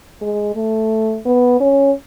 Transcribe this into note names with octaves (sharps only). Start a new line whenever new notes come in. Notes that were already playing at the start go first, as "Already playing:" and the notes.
G#3
A3
B3
C#4